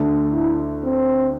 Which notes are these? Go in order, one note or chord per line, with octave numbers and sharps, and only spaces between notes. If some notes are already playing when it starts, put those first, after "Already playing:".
Already playing: D2 D3 A3 D4 A4
E4
C4